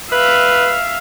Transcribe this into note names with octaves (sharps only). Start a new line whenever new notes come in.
B4 E5 F5